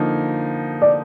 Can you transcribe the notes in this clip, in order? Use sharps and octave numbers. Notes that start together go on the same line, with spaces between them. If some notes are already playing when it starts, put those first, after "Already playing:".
Already playing: D3 F3 A#3 D#4
D5